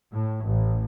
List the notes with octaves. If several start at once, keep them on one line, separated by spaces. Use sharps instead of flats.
A2
A1